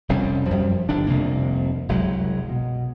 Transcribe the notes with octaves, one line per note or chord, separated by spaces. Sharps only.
F1 C2 G3 C#4
F#2 F3 G3
G1 D#3 D4
F1 C2 C3 A#3
F#1 C2 F#3 G#3
B2